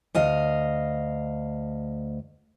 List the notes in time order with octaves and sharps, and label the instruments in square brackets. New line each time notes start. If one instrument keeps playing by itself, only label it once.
[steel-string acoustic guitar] D2 D#5 F5